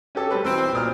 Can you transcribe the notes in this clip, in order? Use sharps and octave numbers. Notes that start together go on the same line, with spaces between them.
C#4 G4 A4
G3 C4 B4
B1 E3 C4 E6
B1 A#2 D#6 F6